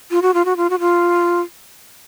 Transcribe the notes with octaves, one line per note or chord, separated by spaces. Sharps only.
F4
F#4
F4
F#4
F4
F#4
F4